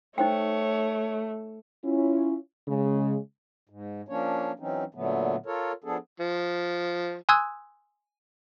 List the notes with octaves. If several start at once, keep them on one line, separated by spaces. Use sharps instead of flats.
A3 D#4 C5 C#5 G5
C#4 E4 F4
C#3 G#3
G#2
F3 A#3 C#4 D4 C#5
E3 F#3 C4 C#4 D#4
A#2 D3 F#3 A3 B3
F4 A4 A#4 C#5
F3 B3 D4 G#4 A4
F3
G#5 C6 D#6 E6 F#6 G#6